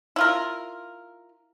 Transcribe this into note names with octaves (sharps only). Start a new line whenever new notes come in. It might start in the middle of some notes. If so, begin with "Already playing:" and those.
E4 F4 A#4